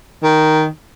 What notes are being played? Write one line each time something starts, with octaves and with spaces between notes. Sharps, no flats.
D#3